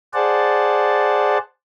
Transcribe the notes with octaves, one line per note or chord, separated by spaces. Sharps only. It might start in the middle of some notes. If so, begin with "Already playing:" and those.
G#4 C5 D5 F#5 A5